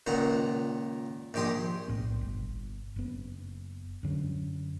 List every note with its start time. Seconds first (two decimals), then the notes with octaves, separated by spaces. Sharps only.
0.07 C#2 A#2 D#3 F#5 A#5
1.34 A#1 D#3 G4 G#4 C6 D#6
1.88 B1 A2 B3
2.21 G1
2.96 F#1 B3
4.03 F#2 D3 F#3